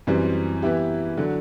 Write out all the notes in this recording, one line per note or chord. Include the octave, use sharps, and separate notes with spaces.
F#2 E3 G3 C4
E3 B3 E4 G4
D3 F#3